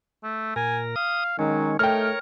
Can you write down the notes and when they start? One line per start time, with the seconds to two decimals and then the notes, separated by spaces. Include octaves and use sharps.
0.23 A3
0.56 A#2 A#4 G#5
0.96 F5 D#6
1.39 D#3 F#3 G#3 C#4
1.79 A3 D#4 A#4 C#5 G5 F6